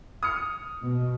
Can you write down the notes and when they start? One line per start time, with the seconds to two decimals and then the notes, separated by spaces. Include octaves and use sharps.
0.23 D#6 F6 C#7
0.83 B2